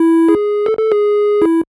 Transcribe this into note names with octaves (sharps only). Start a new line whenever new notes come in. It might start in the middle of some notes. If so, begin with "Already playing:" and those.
Already playing: E4
G#4
A4
A4
G#4
E4